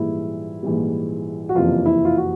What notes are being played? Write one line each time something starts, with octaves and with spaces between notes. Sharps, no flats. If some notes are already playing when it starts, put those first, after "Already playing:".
Already playing: A#1 G#2 E3 G3 E4
A#1 G#2 E3 G3
F#4
F#1 F2 C3 E3 F4
E4
F4
F#4